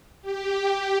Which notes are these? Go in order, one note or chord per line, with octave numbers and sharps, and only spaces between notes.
G4